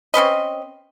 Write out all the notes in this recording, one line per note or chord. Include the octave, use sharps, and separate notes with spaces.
C4 C#4 B4 D#5